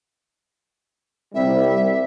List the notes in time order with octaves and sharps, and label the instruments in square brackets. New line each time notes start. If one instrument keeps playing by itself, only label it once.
[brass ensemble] C2 G3 [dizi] E5